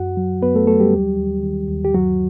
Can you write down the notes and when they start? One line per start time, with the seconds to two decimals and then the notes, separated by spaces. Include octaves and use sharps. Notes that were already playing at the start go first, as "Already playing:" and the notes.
Already playing: F#2 F#4 F#5
0.17 F#3
0.42 F#2 B3 B4
0.55 A3 A4
0.67 F#3 A3 A4
0.80 G3 G4
0.93 D#2
1.18 D#2
1.43 D#3
1.68 D#2
1.85 G4
1.93 G2 F#3 F#4